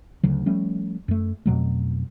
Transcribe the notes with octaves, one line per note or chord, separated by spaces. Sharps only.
D2 C#3 F#3
F3 G3 A3 C#4
F#2 A3
F2 B2 F#3 A3